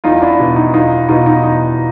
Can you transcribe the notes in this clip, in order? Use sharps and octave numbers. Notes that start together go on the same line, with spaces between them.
E2 D#4 F4
D4 E4
B2
D#4
E2 D#4 F4
B2 D#4 F4
D#4
E2 D#4